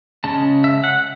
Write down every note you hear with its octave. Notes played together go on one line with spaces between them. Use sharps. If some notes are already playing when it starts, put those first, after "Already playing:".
C#3 G#3 C#4 A5
E5
F#5